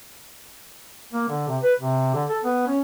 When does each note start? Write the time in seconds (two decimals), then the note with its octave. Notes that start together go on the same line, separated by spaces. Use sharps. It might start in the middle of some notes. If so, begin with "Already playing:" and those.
1.13 A#3
1.29 D3
1.48 C3
1.63 B4
1.80 C3
2.14 D3
2.29 A4
2.44 B3
2.67 C#4